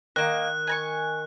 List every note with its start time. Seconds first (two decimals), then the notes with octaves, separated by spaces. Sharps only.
0.16 D#3 A#3 D#5 F#6
0.67 G#5 A#5 C#6